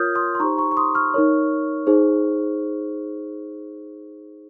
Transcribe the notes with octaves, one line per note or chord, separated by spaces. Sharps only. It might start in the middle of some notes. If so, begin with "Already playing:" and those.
Already playing: F4 A#4 C#5 D#6 F6 G6 G#6
C6 D#6
C6
D#4 G4 C5 A#5 C#6
A#5 C#6
C#6
C6 D#6
C#6 F6
D#4 A#4 C#5
D#4 G#4 C5